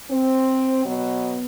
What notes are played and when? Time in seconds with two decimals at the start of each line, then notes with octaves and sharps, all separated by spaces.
0.11 C4
0.86 B2 F#3 B3